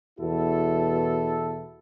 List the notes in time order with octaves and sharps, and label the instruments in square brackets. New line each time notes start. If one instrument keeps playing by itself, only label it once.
[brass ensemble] E2 B2 E4 F#4 A4